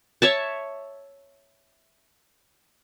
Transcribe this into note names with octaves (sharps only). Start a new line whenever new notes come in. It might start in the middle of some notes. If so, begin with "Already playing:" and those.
C#5 E5 A5